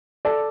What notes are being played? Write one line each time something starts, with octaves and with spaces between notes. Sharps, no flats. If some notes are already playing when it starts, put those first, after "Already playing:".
A4 D5